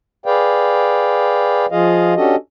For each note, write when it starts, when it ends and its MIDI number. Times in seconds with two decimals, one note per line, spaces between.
0.26 1.66 68
0.26 1.66 71
0.26 1.66 74
0.26 1.66 77
0.26 1.66 79
1.71 2.14 53
1.71 2.14 65
1.71 2.14 68
1.71 2.14 75
1.71 2.14 77
2.16 2.36 61
2.16 2.36 62
2.16 2.36 66
2.16 2.36 67
2.16 2.36 69
2.16 2.36 75